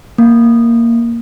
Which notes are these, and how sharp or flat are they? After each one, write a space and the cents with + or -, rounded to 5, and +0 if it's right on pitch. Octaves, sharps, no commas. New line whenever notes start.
A#3 -5